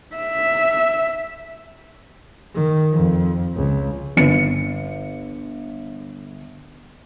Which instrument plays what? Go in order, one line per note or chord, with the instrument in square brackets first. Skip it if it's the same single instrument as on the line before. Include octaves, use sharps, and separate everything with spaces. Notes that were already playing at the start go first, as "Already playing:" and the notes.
[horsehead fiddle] E5
[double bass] D#3
F2
C#2
[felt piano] G1 C#7